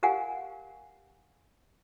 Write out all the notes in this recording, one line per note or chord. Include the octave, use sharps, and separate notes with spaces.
G4 A#4 F5 F#5 G#5